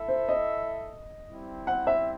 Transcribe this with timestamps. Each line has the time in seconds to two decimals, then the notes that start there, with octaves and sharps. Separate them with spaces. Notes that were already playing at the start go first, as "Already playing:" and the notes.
Already playing: E4 A4 E5
0.08 C5
0.29 D#5
1.27 G3 C4 E4
1.67 F#5
1.87 E5